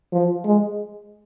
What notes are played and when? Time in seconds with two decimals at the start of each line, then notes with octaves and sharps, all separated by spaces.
0.13 F3
0.46 G#3